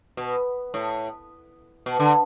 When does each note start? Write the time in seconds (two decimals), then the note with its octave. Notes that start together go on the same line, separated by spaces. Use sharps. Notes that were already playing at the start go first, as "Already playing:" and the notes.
0.17 B2
0.74 A2
1.86 B2
1.99 D3